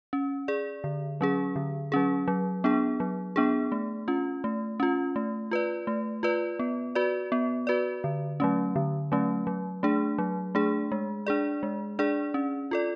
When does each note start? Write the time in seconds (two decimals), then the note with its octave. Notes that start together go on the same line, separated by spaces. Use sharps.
0.13 C#4
0.48 G#4 D5
0.84 D3
1.21 F#3 C#4 G#4
1.56 D3
1.92 F#3 C#4 G#4
2.28 F#3
2.64 B3 D4 G#4
3.00 F#3
3.36 B3 D4 G#4
3.72 A3
4.08 C#4 F4
4.44 A3
4.80 C#4 F4
5.16 A3
5.51 F4 B4 D5
5.87 A3
6.23 F4 B4 D5
6.59 B3
6.95 F#4 B4 D5
7.32 B3
7.67 F#4 B4 D5
8.04 D3
8.40 F#3 A3 C#4
8.76 D3
9.12 F#3 A3 C#4
9.47 F#3
9.83 A3 D4 G#4
10.18 F#3
10.55 A3 D4 G#4
10.92 G#3
11.27 D4 G#4 D5
11.63 G#3
11.99 D4 G#4 D5
12.34 C#4
12.71 F4 A4 D5